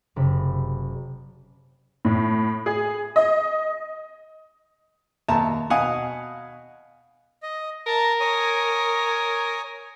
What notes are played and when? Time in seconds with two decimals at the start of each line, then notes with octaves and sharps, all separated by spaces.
0.16 F#1 C3 B5 D6
2.05 A2
2.66 G#4
3.16 D#5
5.28 D#2 E5 A5 A#5
5.70 B2 F5 F#5 G#5 D#6
7.43 D#5
7.87 A#4 A5 A#5
8.20 C#5 G#5 D#6